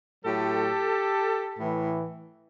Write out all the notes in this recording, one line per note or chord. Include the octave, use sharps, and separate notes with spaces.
A2 F#3 G4 A4
A2 E3